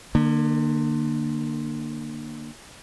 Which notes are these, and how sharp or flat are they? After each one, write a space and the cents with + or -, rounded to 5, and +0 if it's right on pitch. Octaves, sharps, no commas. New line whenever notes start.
D3 +35 A#3 +0